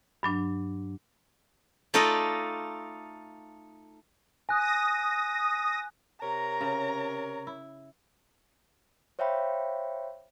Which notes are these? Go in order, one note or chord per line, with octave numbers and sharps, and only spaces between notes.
G2 F#3 D4
A3 D#4 F4 A4 D5 D#5
G#5 D#6 F#6 A#6
C3 A#4 C#5 A#5
C#3
E4
C5 C#5 E5 F5 G5 B5